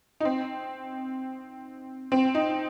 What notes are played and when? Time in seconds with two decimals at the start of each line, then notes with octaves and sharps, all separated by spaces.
0.20 D#4
0.25 C4
2.12 C4
2.35 D#4